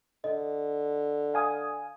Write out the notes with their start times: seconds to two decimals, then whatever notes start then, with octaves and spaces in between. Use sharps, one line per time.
0.24 D3 D#5
1.34 F5 G#5 D#6